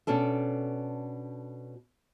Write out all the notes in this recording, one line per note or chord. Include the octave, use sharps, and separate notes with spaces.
B2 C#4 D4 A4